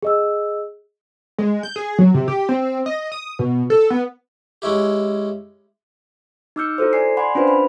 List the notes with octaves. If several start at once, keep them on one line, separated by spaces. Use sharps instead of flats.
G#4 D#5 E6
G#3
G6
G#4
F#3
C3
G4
C4
D#5
D#6
B2
A4
B3
G#3 C#4 E4 G4
D#4 D6 E6 F6 G6 C#7
E4 F#4 A4 C5
D5 G#5 C7
D5 F#5 G#5 B5 C6
C#4 D4 F4 B4 C5
B5